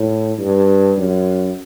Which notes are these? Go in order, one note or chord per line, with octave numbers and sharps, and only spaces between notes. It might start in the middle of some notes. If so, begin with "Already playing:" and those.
Already playing: A2
G2
F#2